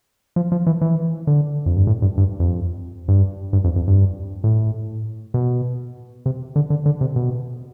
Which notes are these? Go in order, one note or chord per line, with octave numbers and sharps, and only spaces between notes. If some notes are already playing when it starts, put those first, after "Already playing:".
F3
F3
E3
E3
D3
F2
G2
A2
G2
G2
F2
G2
G2
F2
F2
G2
A2
B2
C3
D3
D3
D3
C3
B2